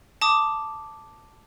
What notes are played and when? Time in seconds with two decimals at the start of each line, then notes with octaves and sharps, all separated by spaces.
0.21 A5 D6 D#6